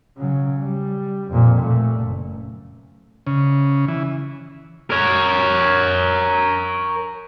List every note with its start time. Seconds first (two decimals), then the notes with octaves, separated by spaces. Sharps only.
0.18 C#3 F#3
0.60 G3
1.31 F2 A#2
1.59 A#2 A3
2.00 F#1
3.27 C#3
3.88 E3
4.91 A#4 C#5